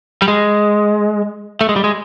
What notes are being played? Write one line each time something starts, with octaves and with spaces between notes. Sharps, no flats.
G3
G#3
A3
G#3
G3
G#3